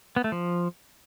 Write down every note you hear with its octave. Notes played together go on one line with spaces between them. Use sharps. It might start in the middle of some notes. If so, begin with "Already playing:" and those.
B3
A3
F3